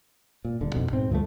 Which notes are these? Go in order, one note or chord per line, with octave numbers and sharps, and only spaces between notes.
A#2
D#1 D3
B1 F2 B2
G#2 B2 C4
D2 G2 F3 A3